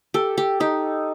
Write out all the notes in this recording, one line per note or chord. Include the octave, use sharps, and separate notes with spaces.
G4 A4
G4
D#4 G4